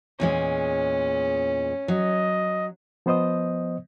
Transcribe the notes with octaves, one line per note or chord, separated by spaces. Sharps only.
E2 A#2 G#3 C#4
F#3 D#5
F3 B3 C5 D#5 D#6